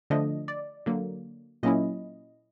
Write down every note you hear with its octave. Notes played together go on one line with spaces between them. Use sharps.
D3 F3 A3 D4 D#5
D5
D3 F#3 A#3
A#2 F#3 A#3 C#4 E4 D#5